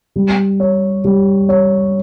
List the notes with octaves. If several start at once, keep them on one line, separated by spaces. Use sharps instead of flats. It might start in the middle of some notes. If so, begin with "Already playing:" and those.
G3
C#5
G3
C#5